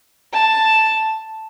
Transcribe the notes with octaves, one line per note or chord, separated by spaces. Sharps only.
A5